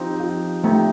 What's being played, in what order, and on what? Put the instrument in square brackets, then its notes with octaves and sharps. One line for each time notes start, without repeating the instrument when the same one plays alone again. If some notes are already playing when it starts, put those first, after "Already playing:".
Already playing: [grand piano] F3 C4 D#4 G4
F3
[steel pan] A3 [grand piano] C4 D#4 G4